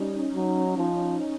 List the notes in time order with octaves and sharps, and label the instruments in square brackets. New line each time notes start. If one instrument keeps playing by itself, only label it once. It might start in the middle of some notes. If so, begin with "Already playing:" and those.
Already playing: [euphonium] G3 [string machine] C#4 D#4
[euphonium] F#3
F3